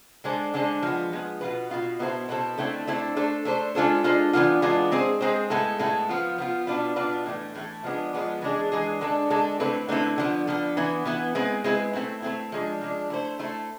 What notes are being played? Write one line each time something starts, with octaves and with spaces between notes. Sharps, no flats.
D3 G#3 D4 A4 C5
D3 G#3 D4 A4 C5
F3 G#3 B3
F3 G#3 B3
B2 B3 F4 B4
B2 B3 F4 B4
B2 B3 E4 A4 C5
B2 B3 E4 A4 C5
D3 A3 C4 E4 A4
D3 A3 C4 E4 A4
A3 D4 A4 C5
A3 D4 A4 C5
G#3 D4 F4 A4 C5
G#3 D4 F4 A4 C5
E3 G#3 B3 D4 F4
E3 G#3 B3 D4 F4
G#3 C4 G#4 C5
G#3 C4 G#4 C5
A2 G#3 B3 E4 A4
A2 G#3 B3 E4 A4
F3 B3 F4
F3 B3 F4
B2 B3 D4 F4 B4
B2 B3 D4 F4 B4
A2 E3 A3
A2 E3 A3
F3 G#3 B3 D4
F3 G#3 B3 D4
E3 G#3 D4 G#4
E3 G#3 D4 G#4
D3 G#3 D4 A4
D3 G#3 D4 A4
D3 A3 C4 E4 B4
D3 A3 C4 E4 B4
D3 F3 B3
D3 F3 B3
E3 B3 E4
E3 B3 E4
G#3 C4 E4 B4
G#3 C4 E4 B4
A3 C4 E4
A3 C4 E4
F3 G#3 D4
F3 G#3 D4
A3 E4 A4 C5
A3 E4 A4 C5